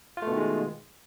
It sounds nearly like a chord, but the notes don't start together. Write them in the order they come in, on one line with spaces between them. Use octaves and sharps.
F4 A3 B2 D#3 G#3